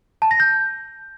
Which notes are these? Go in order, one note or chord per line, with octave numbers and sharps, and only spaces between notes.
A5
A#6
G6